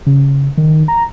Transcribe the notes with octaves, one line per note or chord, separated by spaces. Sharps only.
C#3
D#3
A#5